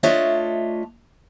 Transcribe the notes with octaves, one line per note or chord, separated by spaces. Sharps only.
A3 D4 F4 C#5 D#5 E5